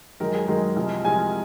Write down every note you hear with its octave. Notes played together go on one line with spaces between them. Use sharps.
F#2 D#3 G#3 A#4
G#4
F#2 D#3 G#3 A#4
C2 C3 F3 G#3
C2 C3 F3 G#3 G#5